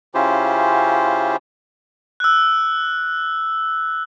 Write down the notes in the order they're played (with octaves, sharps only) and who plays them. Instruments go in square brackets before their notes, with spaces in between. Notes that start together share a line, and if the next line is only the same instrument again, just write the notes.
[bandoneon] C#3 C#4 E4 F4 G4 C5
[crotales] E6 F#6